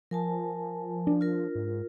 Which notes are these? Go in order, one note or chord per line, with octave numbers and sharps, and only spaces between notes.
F3 A#4 G#5 A5
D4
F4 A#4
G#2